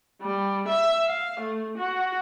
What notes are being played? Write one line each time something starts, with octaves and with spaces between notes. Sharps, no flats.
G3
E5
F5
A3
F#4